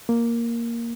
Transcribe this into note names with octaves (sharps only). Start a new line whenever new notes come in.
A#3